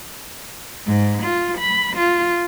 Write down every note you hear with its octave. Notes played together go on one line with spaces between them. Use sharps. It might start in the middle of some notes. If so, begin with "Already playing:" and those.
G#2
F4
B5
F4